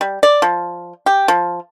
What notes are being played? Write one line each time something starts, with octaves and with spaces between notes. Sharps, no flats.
G3
D5
F3
G4
F3